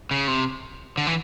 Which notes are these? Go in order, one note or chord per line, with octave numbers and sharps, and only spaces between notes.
C#3
C3
D3
E3